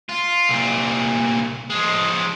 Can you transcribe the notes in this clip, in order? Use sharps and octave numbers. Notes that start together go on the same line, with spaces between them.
F4
C2 A#2
F3 G#3